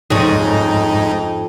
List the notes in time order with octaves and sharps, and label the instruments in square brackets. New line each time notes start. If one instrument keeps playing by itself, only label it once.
[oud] F2 C#4 G#4 [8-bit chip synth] G#2 D#4